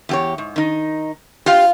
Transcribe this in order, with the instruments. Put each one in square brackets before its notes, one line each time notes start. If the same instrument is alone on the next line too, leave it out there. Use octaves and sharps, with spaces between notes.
[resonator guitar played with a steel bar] E2 G4 C#5
G#2
D#3 D#4
[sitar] F4 [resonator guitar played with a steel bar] G4 F5